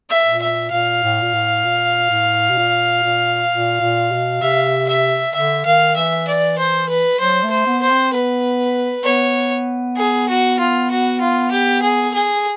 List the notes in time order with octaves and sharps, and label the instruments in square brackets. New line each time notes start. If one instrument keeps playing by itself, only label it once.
[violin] E5
[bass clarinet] A#2
[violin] E5
[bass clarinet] A#2 [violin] F5
[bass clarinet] A2
A#2
A2
A#2
A2
B2
A#2
A#2
A#2
A#2
B2
[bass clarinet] C3 [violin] E5
[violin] E5
[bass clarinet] D3 [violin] E5
[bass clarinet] D#3 [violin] F5
[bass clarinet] E3 [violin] E5
[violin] D5
C5
B4
[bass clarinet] F#3 [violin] C5
[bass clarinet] A3
[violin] C5
[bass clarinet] B3
[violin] C5
[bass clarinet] C4
[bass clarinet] B3 [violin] B4
[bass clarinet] B3 [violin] C#5
[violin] G#4
F#4
F4
F#4
F4
G4
G#4
G#4